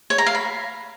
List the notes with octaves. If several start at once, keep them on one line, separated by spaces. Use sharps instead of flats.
C#5
A#5
F5
B5